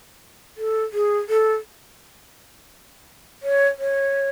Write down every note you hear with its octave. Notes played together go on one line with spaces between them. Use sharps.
A4
G#4
A4
C#5
C#5